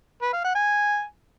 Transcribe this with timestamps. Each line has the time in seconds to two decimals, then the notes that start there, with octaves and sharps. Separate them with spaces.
0.22 B4
0.33 F5
0.44 F#5
0.55 G#5